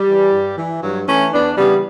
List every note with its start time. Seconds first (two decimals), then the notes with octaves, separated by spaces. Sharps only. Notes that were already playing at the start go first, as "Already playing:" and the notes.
Already playing: G3
0.08 E3
0.33 G2
0.58 E3
0.83 G2 F#3
1.08 E3 A3 C#4
1.32 E2 B3 D4
1.57 C#3 E3 G3 B3